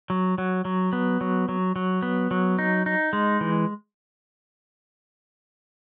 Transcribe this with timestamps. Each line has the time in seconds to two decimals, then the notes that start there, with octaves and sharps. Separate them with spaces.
0.10 F#3
0.38 F#3
0.65 F#3
0.93 B3
1.21 F#3
1.49 F#3
1.76 F#3
2.02 B3
2.31 F#3
2.59 D#4
2.86 D#4
3.13 G#3
3.41 E3